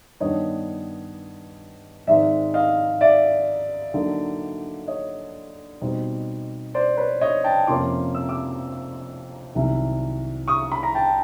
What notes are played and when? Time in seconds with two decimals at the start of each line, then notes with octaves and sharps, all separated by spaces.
0.20 G2 D#3 G3 B3 D4 C#5 D#5
2.07 G#2 D#3 G#3 C4 D5 E5
2.54 D#5 F5
3.01 D5 E5
3.94 D3 F#3 A#3 D#4
4.87 C#5 D#5
5.81 B2 G3 C4 D#4
6.74 C5 D5
6.97 B4 C#5
7.21 C#5 D#5
7.44 G5 A5
7.67 F2 C3 F3 A#3 C#4 C6 D6
8.15 E6
8.29 D6 E6
9.54 C2 C3 D#3 F#3
10.48 C#6 D#6
10.72 B5
10.83 A#5
10.95 G5 A5